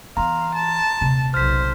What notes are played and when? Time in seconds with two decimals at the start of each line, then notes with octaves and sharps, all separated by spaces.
0.17 E3 B3 F5 A#5 C6
0.55 A5
1.01 D#1 C3
1.34 B1 C5 F6 B6